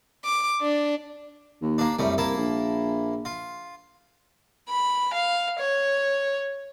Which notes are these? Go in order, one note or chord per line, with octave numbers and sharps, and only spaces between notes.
D6
D4
D#2
A#3 D4
C2 F#2 G3 A3
A#3 E4 A5
A#1
F4
B5
F5
C#5